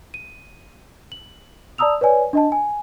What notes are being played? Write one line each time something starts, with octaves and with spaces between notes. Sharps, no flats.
D#7
F#7
D5 A5 A#5 D#6 E6 F7
B4 C#5 D5 G#5
D4 D#5 A5
G#5